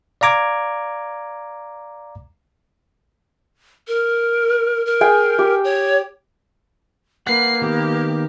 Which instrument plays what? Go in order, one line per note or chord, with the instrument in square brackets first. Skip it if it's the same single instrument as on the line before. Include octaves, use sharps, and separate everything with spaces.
[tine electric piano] D5 F5 A#5 D6 G#6
[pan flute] A#4
A#4
[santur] G#4 G5 G#5
G4
[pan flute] C#5
[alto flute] A#3 [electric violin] B4 C7 [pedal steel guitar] F#5
[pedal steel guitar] D#3 B3 [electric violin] G4